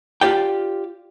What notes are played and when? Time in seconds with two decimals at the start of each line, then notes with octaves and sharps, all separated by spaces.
0.21 F4 G4 D5 G5